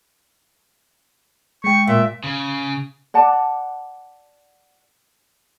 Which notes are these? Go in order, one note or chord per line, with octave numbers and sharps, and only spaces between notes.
G#3 G5 C#6
A#2 E5
C#3
D5 F#5 A5